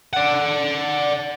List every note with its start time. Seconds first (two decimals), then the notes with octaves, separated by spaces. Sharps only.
0.13 D5 F#5